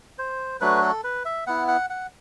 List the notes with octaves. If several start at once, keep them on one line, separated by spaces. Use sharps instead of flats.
C5
F#3 A3 D4 F#4 B4
A4
B4
E5
B3 E4 F#5
F#5
F#5